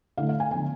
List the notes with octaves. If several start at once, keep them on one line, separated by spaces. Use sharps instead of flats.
D3 A3 E4 F5
F5
G#5
D3 F3 B3 G#5